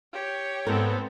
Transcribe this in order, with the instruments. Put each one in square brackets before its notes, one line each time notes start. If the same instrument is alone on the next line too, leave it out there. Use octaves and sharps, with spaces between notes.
[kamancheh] G4 C#5
[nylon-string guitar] G#2 A#4 [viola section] B3 C4 A4